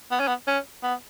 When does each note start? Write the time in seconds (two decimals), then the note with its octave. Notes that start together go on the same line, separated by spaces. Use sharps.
0.11 B3
0.20 C#4
0.28 B3
0.47 C#4
0.83 B3